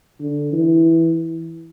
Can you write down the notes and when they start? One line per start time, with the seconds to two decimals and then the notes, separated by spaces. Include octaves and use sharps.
0.20 D3
0.53 E3